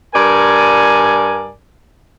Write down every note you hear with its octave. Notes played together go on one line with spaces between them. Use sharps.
G2 A#4 D5 G#5